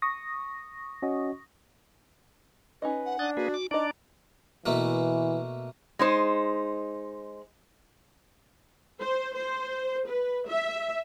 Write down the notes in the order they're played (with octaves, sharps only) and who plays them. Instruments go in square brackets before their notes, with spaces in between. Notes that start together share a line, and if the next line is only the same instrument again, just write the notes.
[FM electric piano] C#6 D#6 A#6
[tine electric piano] C#4 F#4 D#5
[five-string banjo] C#4 D#4 D#5 [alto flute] B4
[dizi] F#5
[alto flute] D4 [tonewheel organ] D#6 F#6 A6
[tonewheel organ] A#3 G#4 B4 [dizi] F#4
[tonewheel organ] D6
[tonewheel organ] D4 D5 [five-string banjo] D#4 D#5 [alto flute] A#5 [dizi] D6
[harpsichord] B2 A3 A#3 [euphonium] E3
[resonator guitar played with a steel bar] G#3 D#4 C5
[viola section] C5
C5
B4
E5